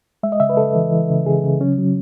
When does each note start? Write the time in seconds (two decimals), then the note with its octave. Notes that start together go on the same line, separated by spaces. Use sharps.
0.23 G#3 E5
0.32 D#5
0.40 C#3 E5
0.50 B4
0.57 C#3 A4
0.75 E3
0.92 E3
1.10 C#3
1.26 C#3 G#4
1.44 C#3
1.61 F#3 C#4
1.78 F#3